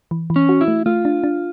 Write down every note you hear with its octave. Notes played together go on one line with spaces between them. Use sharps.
E3
E3
C#4
F#4
E4
A3
A3 F4
D4
D4